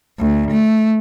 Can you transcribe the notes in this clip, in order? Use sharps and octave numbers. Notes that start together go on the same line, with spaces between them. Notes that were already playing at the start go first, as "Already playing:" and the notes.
D2
A3